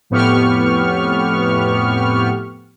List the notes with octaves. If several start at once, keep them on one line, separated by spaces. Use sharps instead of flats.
F2 A2 B3 G4 C#6 F6